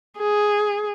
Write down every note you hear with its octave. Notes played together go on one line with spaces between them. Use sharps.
G#4